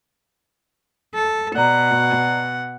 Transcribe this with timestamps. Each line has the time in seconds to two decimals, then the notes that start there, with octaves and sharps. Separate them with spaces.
1.15 A4
1.56 B2 D5 F#5 A#5